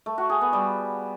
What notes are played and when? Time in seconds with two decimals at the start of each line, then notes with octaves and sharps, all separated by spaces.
0.06 A3
0.18 F#4
0.29 G#4
0.41 B3
0.53 G3